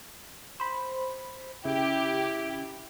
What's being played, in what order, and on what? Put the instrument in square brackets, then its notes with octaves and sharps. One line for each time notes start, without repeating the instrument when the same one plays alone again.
[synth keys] C5 B5
[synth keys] C#3 [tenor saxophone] E4 [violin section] G4